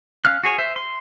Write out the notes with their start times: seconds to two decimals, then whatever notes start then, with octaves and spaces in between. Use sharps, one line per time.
0.25 C#4 F5 F6 F#6
0.43 F#4 G#4 C#5 G#5
0.58 C5 E5
0.76 C6